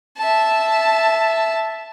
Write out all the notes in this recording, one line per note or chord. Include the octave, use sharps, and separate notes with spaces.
E5 A5